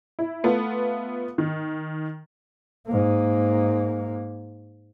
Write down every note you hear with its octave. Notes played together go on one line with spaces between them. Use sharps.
E4
A3 B3 F4
D#3
G#2 A#3